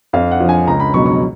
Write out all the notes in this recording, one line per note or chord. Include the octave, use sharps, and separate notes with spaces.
F2 F5
F#5
F3
G#5
C#2 A#5
B5
B2 F#3 C#6
C#6